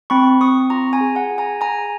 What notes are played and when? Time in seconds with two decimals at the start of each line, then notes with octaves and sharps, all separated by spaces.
0.10 C4 B5 C#6
0.41 C4 C#6 D#6
0.70 F4 A#5 C6
0.93 G#5 A#5
1.01 G#4
1.15 F#5 G#5
1.31 G#4
1.38 G#5 A#5
1.61 G#4 G#5 A#5